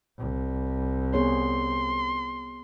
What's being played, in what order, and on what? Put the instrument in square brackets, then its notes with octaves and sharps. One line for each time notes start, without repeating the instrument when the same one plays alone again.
[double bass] C2
[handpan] B3 G#4 C#5 [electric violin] C6